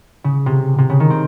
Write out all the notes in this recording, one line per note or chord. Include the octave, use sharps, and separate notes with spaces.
C#3
C3
C3
C#3
D#3
C4